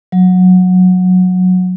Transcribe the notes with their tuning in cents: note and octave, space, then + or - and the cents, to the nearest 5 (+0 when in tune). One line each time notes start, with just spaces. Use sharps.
F#3 -15